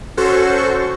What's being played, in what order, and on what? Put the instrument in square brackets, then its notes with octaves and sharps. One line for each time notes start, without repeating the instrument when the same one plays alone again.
[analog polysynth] C#4 F#4 A4 C5 C#6